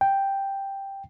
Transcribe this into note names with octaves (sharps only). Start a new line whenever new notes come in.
G5